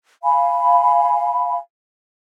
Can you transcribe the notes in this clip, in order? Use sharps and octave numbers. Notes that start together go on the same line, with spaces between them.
F5 G#5 B5